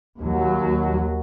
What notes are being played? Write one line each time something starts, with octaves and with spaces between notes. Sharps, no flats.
D#2 F#3